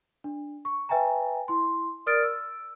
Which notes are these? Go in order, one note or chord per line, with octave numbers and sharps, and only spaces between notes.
D4
C#6
B4 E5 G5 G#5 A#5
E4 C6
A#4 D5 D#6 F6 A6 D7
E6